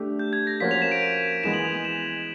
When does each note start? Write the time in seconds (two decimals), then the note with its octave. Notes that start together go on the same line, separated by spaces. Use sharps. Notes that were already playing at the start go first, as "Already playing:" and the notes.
Already playing: A3 D4 G4
0.19 G6
0.33 G#6
0.47 A#6
0.60 F3 A#3 C#4 F#4 A#4 B6
0.71 F7
0.82 E7
0.91 D7
1.02 D#7
1.44 E3 G#3 B3 E7
1.54 F#7
1.65 F7
1.75 E7
1.85 E7